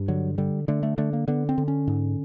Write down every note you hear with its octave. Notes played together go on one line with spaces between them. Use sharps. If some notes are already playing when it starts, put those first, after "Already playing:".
Already playing: G2
D3 F#3
D3 G3
D3 A3
A3
D3 A3
A#3
D3 B3
C4
D3
C#4
G#2